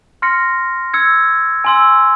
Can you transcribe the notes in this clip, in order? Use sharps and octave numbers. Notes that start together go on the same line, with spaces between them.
C6 F6 A#6 C#7
E6 G#6 C#7
G#5 C6 E6